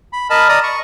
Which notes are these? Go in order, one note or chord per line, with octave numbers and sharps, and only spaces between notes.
B5
A#4 D#5 A5 B5
D5 D#5 A#5 D#6
C#6